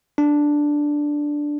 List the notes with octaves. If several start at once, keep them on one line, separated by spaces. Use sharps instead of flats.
D4